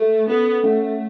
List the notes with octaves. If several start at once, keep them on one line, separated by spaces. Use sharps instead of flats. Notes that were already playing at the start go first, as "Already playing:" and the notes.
Already playing: A3
B3 C#4 A4 F#5
A3 C#4 A4 F#5